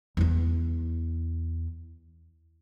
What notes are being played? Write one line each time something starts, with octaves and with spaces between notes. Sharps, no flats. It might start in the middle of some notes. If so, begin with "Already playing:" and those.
E2 E4